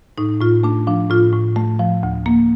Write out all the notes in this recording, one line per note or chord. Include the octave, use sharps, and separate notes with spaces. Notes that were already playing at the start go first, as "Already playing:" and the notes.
A2 D#4
A2 F4
A3 D4
F3 D4
A2 F4
A2
A3
F3
D2
A#3